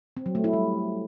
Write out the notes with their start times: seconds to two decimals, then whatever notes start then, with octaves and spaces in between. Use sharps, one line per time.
0.17 C4
0.26 F#3
0.35 A3
0.44 E4
0.53 G3